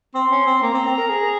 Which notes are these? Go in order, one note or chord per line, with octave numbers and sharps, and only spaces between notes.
C4 C6
C#4
C4
A#3 A#5
C4
C4
A#4
G#4